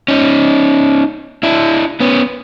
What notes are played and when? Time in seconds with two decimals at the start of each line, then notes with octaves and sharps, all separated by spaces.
0.08 C#4 D#4
1.43 D4 E4
2.00 B3 C#4